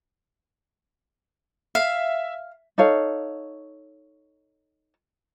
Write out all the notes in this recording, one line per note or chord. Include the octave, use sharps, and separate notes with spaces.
E5 F5
D#4 A4 C#5 F5